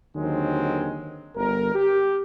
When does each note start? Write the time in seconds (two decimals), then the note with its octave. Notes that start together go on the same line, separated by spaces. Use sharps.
0.16 D#2 D3 D#3 F#3 G#3 C4
1.36 G1 A#4
1.75 G4